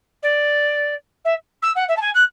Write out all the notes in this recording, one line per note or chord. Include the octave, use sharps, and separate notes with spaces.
D5
E5
E6
F#5
E5
A5
G#5
F#6